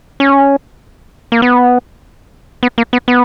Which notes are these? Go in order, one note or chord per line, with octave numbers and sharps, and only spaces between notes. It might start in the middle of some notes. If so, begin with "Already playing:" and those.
C#4
A#3
B3
B3
A#3
B3
B3